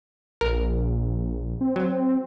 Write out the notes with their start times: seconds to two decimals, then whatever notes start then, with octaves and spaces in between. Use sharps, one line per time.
0.41 A#1 A#4
1.61 C4
1.76 F#3 C4